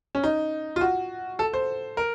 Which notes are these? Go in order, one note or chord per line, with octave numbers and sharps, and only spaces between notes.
C#4
D#4
F4
F#4
A4
C5
A#4